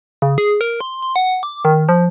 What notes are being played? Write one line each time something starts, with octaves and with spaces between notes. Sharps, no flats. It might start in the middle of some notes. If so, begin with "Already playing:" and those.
C#3
G#4
A#4
C6
C6
F#5
D6
D#3
F3